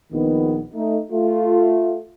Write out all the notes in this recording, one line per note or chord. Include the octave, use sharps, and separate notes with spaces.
A#1 D#3 B3
A3 D#4
A3 F4